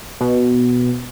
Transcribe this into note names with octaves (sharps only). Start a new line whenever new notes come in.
B2